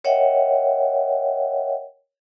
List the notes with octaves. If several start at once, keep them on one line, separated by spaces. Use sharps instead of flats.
A#4 C#5 D#5 E5 F#5 G5